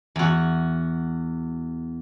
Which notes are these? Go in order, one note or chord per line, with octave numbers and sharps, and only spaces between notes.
E2 F#4